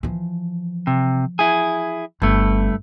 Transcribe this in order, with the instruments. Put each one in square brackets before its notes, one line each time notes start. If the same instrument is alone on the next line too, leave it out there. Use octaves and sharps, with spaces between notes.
[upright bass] E3 F3
[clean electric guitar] C3
E4 G#4
[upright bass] G1 [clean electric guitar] G2 A3